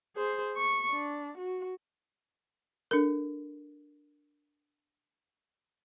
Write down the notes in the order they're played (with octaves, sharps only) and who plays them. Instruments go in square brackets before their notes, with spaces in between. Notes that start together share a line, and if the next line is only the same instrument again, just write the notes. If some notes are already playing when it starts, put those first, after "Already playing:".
[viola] G#4 C5
C#6
D4
F#4
[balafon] D4 A4 A#4